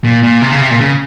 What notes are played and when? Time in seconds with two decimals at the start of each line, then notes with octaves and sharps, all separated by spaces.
0.04 A#2
0.23 A#2
0.42 C3
0.51 C#3
0.61 C3
0.71 A#2
0.81 C#3